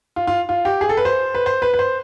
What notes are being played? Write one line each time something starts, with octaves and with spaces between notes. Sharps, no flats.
F4
F4
F4
G4
G#4
A4
B4
C5
B4
C5
B4
B4
C5